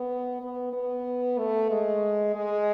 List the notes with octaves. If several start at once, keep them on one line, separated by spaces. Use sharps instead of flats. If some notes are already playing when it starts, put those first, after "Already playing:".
Already playing: B3
B3
B3
A3
G#3
G#3